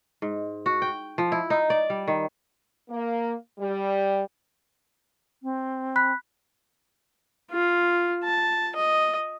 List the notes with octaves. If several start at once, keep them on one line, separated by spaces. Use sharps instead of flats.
G#2
F#4
G5
F3
E4
D#4
D5
G3
D#3
A#3
G3
C4
B5 F#6 B6
F4
A5
D#5